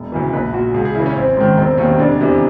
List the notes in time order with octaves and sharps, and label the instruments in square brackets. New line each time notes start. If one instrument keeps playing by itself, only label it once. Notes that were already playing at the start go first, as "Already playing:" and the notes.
Already playing: [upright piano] E1
D2 C#3 E3
A#1 B4
A#2 F#4
C#2 G#4
G#4
C#3 E3 E4
C#4
A1 C4
G#2 D#3 C#4
E1 C4
D#2 D#3 C#4
F1 D4
E2 C3 E3